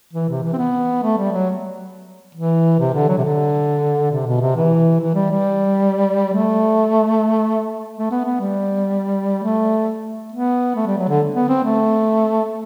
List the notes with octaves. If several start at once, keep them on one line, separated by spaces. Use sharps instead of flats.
E3
C3
E3
C4
B3
A3
G3
F#3
E3
C3
D3
F#3
C3
D3
C3
B2
C3
E3
E3
G3
G3
A3
A3
B3
B3
G3
A3
B3
A3
G3
F#3
D3
B3
C4
A3